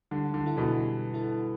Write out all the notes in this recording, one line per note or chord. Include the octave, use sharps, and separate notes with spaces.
D3 G3
D3
E4 A4
B2 E3
G3
E4 A4